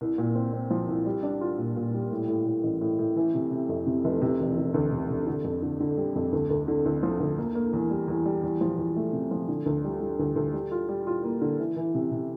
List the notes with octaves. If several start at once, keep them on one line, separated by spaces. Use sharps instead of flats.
C2
A#2
C4
C4
F3
C2
G3
D4
F4
A#2
A#2
G3
A2
A2
A2
A1
A2
A2
E3
C3
C3
F2
C3
F1
C3
E1
C3
D2
C3
C3
D3
F2
D3
D3
G3
F2
D2
D2
D3
D2
F3
D2
A#3
A#3
E2
G3
E2
G3
E2
F3
E2
A3
C3
F3
D3
D2
G3
G3
D2
D2
G3
F4
G3
F4
A#3
D3
E3
E3
C3
C3